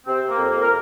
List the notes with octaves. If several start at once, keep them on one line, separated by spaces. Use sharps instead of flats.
C3 C4
A#3
F2
A#3
A#4